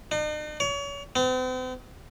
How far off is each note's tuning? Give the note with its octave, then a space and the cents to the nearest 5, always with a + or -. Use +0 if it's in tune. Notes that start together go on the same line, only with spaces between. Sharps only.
D#4 -45
C#5 +35
C4 -45